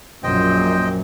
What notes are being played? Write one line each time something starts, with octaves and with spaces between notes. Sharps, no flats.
A#1 F#2 A#2 C5 D#5 G5